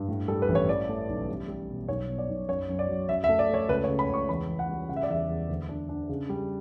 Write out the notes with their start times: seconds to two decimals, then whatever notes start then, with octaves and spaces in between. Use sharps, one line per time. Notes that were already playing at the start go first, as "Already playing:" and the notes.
Already playing: G2
0.08 A2
0.28 G3 A4
0.42 B4
0.48 A1
0.55 C#5
0.69 E3 D5
0.89 A3
1.09 B1
1.29 G3
1.48 G3
1.69 B2
1.88 B1 C#5
2.08 B2
2.18 D5
2.28 B1
2.48 F#2 C#5
2.69 F#2
2.79 D5
2.89 F#3
3.09 F#2 E5
3.24 E5
3.29 A3
3.39 D5
3.49 A3 C#5
3.69 C#2 B4
3.84 C#5
3.89 C#3
3.99 B5
4.09 C#2
4.14 C#6
4.29 E2 B5
4.49 E2
4.59 F#5
4.69 G3
4.89 C#3 F#5
4.96 E5
5.03 D5
5.09 E2 E5
5.29 E2
5.49 D2
5.69 D4
5.89 D4
6.09 C#3
6.29 G3